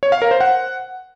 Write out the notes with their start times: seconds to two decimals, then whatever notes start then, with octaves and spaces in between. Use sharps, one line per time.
0.03 C#5
0.12 F5
0.22 A#4
0.31 C5
0.41 F#5